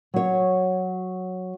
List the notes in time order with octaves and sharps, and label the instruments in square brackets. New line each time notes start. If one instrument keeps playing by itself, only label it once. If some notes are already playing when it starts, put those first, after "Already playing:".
[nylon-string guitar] F#3 C#5